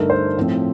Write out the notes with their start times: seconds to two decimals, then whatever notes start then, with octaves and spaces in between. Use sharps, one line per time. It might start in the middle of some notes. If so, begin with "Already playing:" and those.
Already playing: G2 D3 A3 D#4 A#4
0.10 C5
0.37 A2 F3 C4